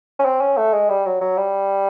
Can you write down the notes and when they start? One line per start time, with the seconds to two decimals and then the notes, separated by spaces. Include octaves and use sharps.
0.19 C#4
0.25 C4
0.41 C#4
0.57 A3
0.73 G#3
0.89 G3
1.06 F#3
1.21 F#3
1.37 G3